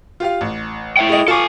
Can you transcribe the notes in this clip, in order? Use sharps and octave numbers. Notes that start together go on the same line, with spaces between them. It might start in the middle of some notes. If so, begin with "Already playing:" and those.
F4 G4 F5
A1
E4 E5 G5
G#4 D#5
F4 A4 G#5 C#6 D6